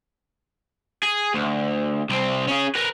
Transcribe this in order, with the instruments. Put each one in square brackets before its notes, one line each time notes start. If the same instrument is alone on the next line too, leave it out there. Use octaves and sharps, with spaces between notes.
[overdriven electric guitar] G#4
D2
C2 C4
C#4 G#4
A#4 B4